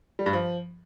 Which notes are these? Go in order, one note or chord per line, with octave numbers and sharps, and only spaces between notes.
G3
G2
F3